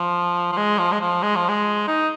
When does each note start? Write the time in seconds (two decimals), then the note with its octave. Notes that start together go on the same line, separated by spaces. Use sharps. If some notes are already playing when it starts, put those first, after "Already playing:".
Already playing: F3
0.52 F3
0.57 G#3
0.78 F3
0.92 G#3
1.01 F3
1.23 G#3
1.36 F3
1.49 G#3
1.88 D#4